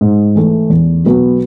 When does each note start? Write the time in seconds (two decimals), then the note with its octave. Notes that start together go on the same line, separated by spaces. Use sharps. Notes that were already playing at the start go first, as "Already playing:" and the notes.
0.01 G#2
0.35 E3 A3
0.70 E2
1.05 B2 F#3 B3